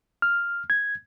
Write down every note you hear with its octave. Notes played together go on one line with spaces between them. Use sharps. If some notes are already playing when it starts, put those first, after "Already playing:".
F6
G#6